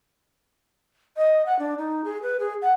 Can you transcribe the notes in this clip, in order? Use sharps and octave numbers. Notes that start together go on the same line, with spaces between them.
D#5
F#5
D4
D#4
G#4
B4
G#4
F#5